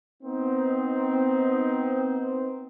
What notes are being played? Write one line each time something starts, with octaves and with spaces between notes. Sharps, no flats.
B3 C4 D#4